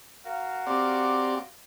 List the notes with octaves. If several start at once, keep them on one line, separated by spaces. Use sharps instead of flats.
F#4 A#4 F5
C4 G4 D5